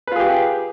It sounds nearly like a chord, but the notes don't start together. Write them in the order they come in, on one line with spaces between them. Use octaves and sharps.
B4 F4 G#4 G4